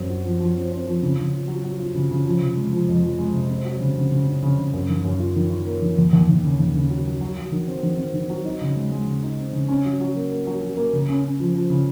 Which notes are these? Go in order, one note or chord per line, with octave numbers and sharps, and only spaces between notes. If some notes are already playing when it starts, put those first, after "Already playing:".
Already playing: F#2 C4
F#4
F3
F3
C4
C4
F3
C#3
C#3
F4
F#3
F#3
F4
C#3
C#3
F3
C3
G#3
F3
F2
F3
G#3
C3
C4
F#3
C#3
C#3
C#3
C#3
C#3
C#3
F#2
D#3
F#2
F4
D#3
F4
A#3
D#3
D#2
D#2
D#2
C#3
D#2
C#3
F#3
F#3
F#3
F#3
D#3
C4
D#3
C4
D#3
F#3
D#4
C#3
G#3
G#3
C#3
D#4
C4
C#3
C#4
F#3
F#3
A#3
A#3
F#3
F#3
A#3
C#3
C#4
C#4
F3
F3
C#3